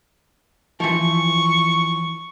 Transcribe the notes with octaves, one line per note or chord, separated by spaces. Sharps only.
E3 F3 C#6